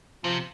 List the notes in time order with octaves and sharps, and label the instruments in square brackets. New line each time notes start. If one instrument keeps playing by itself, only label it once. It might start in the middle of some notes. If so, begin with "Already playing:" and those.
[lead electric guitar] C3 [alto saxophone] F3